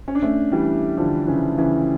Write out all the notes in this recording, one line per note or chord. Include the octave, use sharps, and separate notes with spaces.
C#4
D4
A3 C#4
E3 G3
D3 F3
C#3 E3
C#3 E3